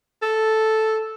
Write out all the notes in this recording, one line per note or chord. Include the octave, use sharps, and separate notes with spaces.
A4